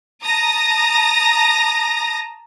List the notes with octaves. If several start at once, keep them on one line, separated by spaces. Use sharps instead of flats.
A5 A#5 D#6 A#6